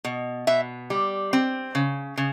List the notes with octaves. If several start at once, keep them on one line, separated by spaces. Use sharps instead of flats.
B2
B2 E5
G3
C4
C#3
C#3